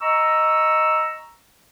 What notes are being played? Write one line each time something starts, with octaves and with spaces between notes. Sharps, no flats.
D#5 A#5 C#6 E6